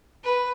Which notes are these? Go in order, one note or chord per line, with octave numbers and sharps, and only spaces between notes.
B4